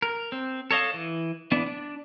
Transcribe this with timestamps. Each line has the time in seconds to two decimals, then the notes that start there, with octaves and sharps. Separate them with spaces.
0.02 A#4
0.32 C4
0.71 A4 C#5 D#5 F5 A5
0.94 E3
1.52 E3 B3 D4
1.66 D4